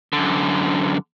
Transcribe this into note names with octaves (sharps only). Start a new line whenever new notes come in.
F#2 D3